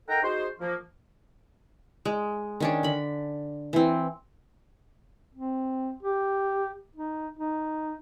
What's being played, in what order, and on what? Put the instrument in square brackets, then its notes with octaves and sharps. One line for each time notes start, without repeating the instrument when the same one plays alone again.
[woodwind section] D#4 A4 A#4 F#5 G5 A#5
D#4 F#4 G#4 C5
F3 A#3
[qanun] G#3
D#3 C#4 D4
D3 B5
E3 C4
[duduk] C4
G4
D#4
D#4